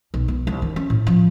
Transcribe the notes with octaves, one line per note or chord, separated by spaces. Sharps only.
B1
B3
C2
D#3
C#4
A2
F3